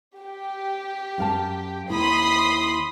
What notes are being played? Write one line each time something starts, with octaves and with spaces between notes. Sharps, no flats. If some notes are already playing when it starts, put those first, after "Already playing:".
G4
F#2 F5 A5
D#2 E4 B5 C6 D#6